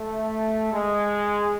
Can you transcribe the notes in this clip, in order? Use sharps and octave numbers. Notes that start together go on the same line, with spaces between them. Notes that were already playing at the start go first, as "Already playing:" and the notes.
Already playing: A3
G#3